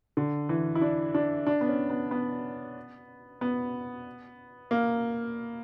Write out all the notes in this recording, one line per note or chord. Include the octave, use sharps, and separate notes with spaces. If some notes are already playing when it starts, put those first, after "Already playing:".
D3
E3
E4
D4
D4
D4
B3
C#4
B3
B3
B3
A#3